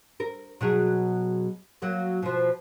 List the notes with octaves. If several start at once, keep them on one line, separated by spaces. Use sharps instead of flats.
A#4
B2 F#3 G#4
F#3 A#3
B2 F3